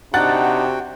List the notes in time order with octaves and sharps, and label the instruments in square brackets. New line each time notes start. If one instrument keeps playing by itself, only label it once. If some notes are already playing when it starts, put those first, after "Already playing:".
[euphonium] C3 [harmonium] D4 D#4 [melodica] F#4 G5 [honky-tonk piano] F#5 F#6 A6